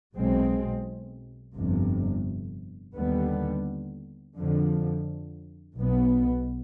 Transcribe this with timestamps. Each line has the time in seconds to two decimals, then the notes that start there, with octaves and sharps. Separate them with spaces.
0.15 B1 B2 G#3 C4
1.55 G1 F2 C3
2.95 D#2 D3 G3 B3
4.36 F2 D3 F3
5.76 B1 B2 B3